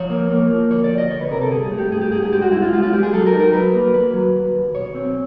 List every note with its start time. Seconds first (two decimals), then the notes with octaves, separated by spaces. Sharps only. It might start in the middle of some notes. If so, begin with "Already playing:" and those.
Already playing: F3 C#5
0.10 A#3
0.30 A#3
0.50 F3
0.71 D2 C#5
0.84 D5
0.91 D2
0.98 D#5
1.11 D2 C#5
1.21 B4
1.31 C3 A#4
1.41 A4
1.51 G2 G#4
1.65 G#4
1.71 A3
1.78 G4
1.92 G2 G#4
2.01 G4
2.12 G2 G#4
2.22 G#4
2.32 G#3 G4
2.42 F#4
2.52 G#3 E4
2.62 F4
2.72 G#3 F4
2.83 F4
2.93 G#3 G4
3.03 G#4
3.13 F#3 A4
3.26 A#4
3.33 D#4
3.40 A#4
3.53 F#3 B4
3.74 A#3
3.93 D#2 B4
4.13 F#3
4.35 D#2
4.55 D#2
4.74 B1 C#5
4.95 C4